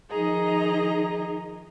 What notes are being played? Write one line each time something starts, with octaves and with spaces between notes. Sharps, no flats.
D#3 F3 D#4 G#4 D#5 A#5